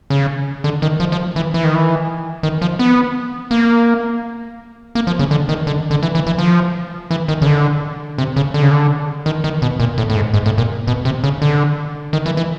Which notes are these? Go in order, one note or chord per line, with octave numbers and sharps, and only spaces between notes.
C#3
D3
D#3
F3
F3
E3
E3
D#3
E3
D#3
F3
B3
A#3
A#3
F3
C#3
D3
D#3
D3
D3
E3
E3
E3
F3
E3
D#3
C#3
D3
C3
C#3
D3
C#3
D3
D#3
D#3
B2
A#2
A2
A2
G#2
G#2
A2
A#2
B2
C3
C#3
D3
D#3
E3
E3